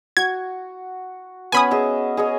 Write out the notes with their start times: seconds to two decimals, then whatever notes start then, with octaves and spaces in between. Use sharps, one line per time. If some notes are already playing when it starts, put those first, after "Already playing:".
0.17 F#4 G#6
1.52 B3 C#4 G#5 B5 D#6
1.71 G#4 D#5 E5
2.17 G#4 C#5 D#5